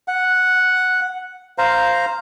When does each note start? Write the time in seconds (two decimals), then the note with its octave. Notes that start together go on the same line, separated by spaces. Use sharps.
0.08 F#5
1.58 C5 F5 A#5